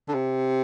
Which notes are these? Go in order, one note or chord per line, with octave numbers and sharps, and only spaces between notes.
D3
C3